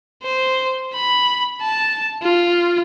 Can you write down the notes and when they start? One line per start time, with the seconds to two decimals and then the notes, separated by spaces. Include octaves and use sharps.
0.23 C5
0.94 B5
1.61 A5
2.22 F4